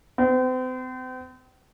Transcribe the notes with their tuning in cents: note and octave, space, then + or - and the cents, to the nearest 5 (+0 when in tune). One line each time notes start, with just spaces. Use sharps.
C4 -40